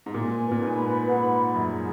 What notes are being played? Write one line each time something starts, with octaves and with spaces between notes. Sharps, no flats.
G#2
A#2 G#5
B4
A#2
G#2
B5
G#2 F#5
G#4
F#2
G#4